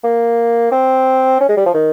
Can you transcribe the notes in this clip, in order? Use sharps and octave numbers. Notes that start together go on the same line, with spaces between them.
A#3
C4
C#4
G#3
G3
F3
D#3